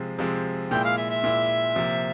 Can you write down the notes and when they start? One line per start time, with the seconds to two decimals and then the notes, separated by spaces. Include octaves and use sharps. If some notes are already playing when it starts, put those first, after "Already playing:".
Already playing: C3 F3 G#3 C4
0.19 C3 F3 G#3 C4
0.71 A#2 G#3 E4 G5
0.84 F5
0.97 E5
1.10 E5
1.24 A#2 G#3 E4
1.76 C3 F3 A#3